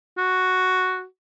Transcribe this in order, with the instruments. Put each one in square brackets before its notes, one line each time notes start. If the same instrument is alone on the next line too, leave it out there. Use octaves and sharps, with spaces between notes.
[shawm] F#4